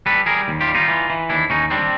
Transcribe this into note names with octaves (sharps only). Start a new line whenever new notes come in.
G3 A4 B4
G3 G#4 A#4
D#2
F4 G4
G3
D#4 F4
E3
E3
D#2 D4 E4
D#2 C#4 D#4
G3 C4 D4